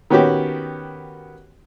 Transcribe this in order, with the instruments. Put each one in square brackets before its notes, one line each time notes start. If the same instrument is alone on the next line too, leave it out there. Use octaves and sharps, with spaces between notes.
[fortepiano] D#3 B3 C#4 F#4 G4